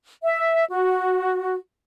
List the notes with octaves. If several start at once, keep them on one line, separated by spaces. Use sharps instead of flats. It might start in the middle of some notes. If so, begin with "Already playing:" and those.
E5
F#4